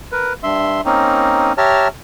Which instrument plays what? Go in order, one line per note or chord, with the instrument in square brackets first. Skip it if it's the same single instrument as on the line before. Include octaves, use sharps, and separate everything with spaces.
[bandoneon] A#4 B4
G2 E5 C6
A#3 C4 C#4 D#4
G4 C#5 E5 A5 A#5 F6